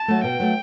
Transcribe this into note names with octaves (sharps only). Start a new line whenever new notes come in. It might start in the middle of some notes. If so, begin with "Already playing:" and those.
Already playing: A5
F#3 A3
B2 G5
F#3 A3